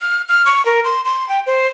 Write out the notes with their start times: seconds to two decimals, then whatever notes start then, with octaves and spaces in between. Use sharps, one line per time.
0.01 F6
0.29 F6
0.46 C#6
0.66 A#4
0.84 C6
1.05 C6
1.29 G5
1.47 C5